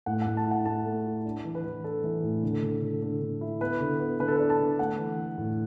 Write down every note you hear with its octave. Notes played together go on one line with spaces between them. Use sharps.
A2 F#5
A2 F#5
A5
E4
F#5
A2 A5
A3
E4
D4
E3
B4
E3
D4 A4
E3
A2
D3
D3
D3
D3
D3
E4
B3 B4
D3
B3
D3 B4
A4
D4 B4
A5
D3
A3 F#5
E3
A3
A2